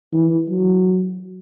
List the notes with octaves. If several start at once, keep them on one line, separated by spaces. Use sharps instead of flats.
E3
F#3